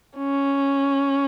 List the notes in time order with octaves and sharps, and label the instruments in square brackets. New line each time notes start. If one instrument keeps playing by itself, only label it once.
[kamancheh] C#4